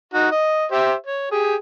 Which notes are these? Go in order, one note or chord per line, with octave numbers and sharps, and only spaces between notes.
D#4 F#4
D#5
G4 C5 E5
C#5
G4 G#4 G5